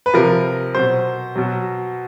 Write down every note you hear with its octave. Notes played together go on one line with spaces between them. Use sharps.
B4
C3 F3 A#4
B2 F#3 C5
B2 F#3